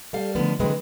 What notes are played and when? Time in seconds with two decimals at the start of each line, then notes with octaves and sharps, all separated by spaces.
0.13 G3 A4 F5
0.35 D3 D#3 F3 A3 B3
0.60 D3 E3 F#3 G#3 C4 B4